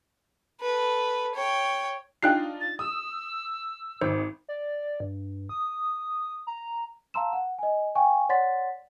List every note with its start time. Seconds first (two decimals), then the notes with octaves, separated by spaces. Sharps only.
0.61 A4 B4
1.35 C#5 G5
2.23 D4 D#4 F4 G5 F#6 C7
2.61 A6
2.79 D#6 E6
4.01 G#1 C5
4.49 D5
5.00 G2
5.49 D#6
6.47 A#5
7.14 F5 A5 A#5 C6 E6 E7
7.33 F#5
7.59 D#5 G#5
7.95 F5 G5 G#5 C#6
8.29 C#5 D5 F#5 C6 A6 B6